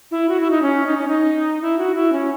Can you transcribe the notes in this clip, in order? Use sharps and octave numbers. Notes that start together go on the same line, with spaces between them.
E4
F#4
E4
D#4
C#4
D#4
C#4
D#4
E4
F#4
E4
C#4